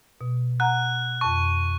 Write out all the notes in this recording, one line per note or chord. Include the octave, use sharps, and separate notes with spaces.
B2
F#5 A#5 F#6
F2 A5 C#6